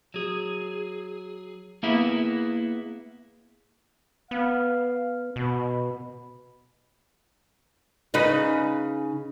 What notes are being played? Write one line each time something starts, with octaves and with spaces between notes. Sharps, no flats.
F#3 G#4
A#3 B3 E4 G#4
B3 F5
B2 B5
C#3 D#4 B4